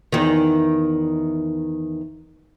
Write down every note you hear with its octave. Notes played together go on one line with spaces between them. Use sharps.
E2 D#3